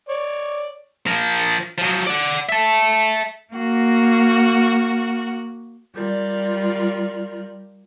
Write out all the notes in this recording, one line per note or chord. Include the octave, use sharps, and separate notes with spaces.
C#5 D5
F3 A#4
F3 F#3
D5 F#5
E5 A5
A#3 F#4
G3 F4 A#4 D5